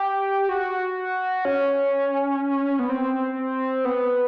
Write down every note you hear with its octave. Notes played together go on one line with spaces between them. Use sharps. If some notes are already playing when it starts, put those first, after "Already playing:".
Already playing: G4
F#4
C#4
B3
C4
B3